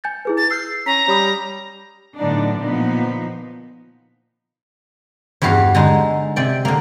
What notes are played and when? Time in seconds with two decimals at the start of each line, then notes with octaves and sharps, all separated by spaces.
0.04 G#5 G6 A6
0.25 E4 G#4 B4
0.37 A6
0.51 E6 F6 G6 C7
0.86 C#4 A#5 B6
1.08 G3 C#5 B5 D#6
2.18 A2 D3 F#3 B3 D4 D#4
2.59 A#2 F3 B3 D#4
5.42 E2 G2 G3 F#4 F5
5.75 D3 G#3 D#4
6.36 C3 D5 G5
6.65 D3 A#3